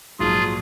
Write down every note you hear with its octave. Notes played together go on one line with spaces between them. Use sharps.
A#1 G#2 F#3 F4 G#4